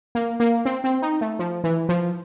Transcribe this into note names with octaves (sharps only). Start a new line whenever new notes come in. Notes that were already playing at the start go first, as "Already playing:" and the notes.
A#3
A#3
C4
C4
D#4
A3
F3
E3
F3